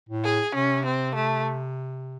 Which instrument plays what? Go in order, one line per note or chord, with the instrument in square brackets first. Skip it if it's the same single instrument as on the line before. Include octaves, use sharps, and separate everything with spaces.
[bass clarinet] A2
[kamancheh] G#4
[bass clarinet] C3 [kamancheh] C#4
[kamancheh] C4
A3